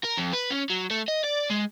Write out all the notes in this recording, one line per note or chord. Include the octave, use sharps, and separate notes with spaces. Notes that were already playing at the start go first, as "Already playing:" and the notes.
A#4
F2
B4
C#4
F#3
A3
D#5
D5
G#3